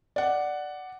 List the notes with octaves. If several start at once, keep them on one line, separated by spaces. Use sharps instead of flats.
D5 F#5